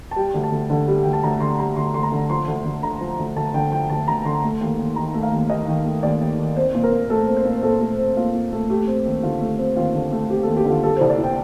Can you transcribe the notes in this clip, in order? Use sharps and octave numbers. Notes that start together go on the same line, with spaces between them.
A5
G3 G5
D2
A5
D2
D3
G3
D2 G5
A5
D2 A#5
D3 C6
G3 A#5
D2 C6
D2 C6
A#5
D3
F3 C6
D2
D2
D3 A#5
F3
D2
D2 A5
D3 G5
F3 G5
D2 A5
D2 A#5
D3 C6
A3
D#2
D#2
D#3 A#5
A3
F5
D#2
D#2 D#5
D#3
A3
D#2 D5
D#2
D#3
C4 C5
A#2
A#4
A#2
A3 A4
C4
C5
A#2
A#2 A4
A3
C4
A#2 F4
A#2
A3
A3 G4
C4
D#2
D3 F4
A3
C4
D#2 F4
D3
A3
C4 G4
D#2 A4
G4
D3 F4
G3 A4
C2 C5
D5
C2 G5